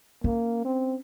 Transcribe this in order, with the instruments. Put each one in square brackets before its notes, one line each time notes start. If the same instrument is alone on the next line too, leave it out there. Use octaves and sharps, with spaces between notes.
[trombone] A#3 [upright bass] C#4
[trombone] C4